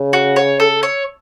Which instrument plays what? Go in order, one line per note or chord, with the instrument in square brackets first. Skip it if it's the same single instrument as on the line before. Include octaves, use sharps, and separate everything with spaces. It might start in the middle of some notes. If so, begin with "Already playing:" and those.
Already playing: [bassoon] C#3
[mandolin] F#4
C#5
A4
C#5